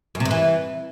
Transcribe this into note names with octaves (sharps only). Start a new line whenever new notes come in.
F#2
C3
G2
E3